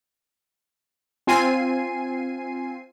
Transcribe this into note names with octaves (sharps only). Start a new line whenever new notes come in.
C4 F4 G#5 C7 D#7